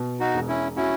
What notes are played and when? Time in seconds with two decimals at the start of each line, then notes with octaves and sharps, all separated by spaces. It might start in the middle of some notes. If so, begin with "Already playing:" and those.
Already playing: B2
0.20 D#4 F#4
0.34 E1
0.48 C#4 E4
0.76 C#4 E4 F#4